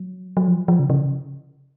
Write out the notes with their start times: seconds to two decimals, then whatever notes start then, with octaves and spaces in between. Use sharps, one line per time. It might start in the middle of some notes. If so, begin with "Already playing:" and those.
Already playing: F#3
0.37 F#3
0.48 F3
0.68 F3
0.79 C#3
0.90 C#3